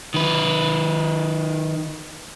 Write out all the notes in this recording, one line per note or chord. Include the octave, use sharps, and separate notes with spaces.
D#3 B4